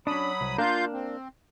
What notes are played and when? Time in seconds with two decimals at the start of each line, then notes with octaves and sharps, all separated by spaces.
0.07 F#3 C#4 D4 B5 D#6
0.41 C2
0.58 A#3 D4 F4 A#4 F5 G6
0.92 C4